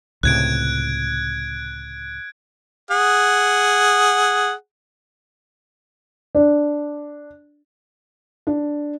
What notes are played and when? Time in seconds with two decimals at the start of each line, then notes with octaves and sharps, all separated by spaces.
0.23 C#2 A2 C3 F#6 G#6 D7
2.91 G#4 F#5
6.35 D4
8.47 D4